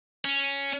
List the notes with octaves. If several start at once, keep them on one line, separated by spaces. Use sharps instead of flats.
C#4